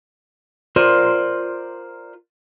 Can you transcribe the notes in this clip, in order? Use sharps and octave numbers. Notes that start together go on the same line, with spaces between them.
F4 A#4 C5 D5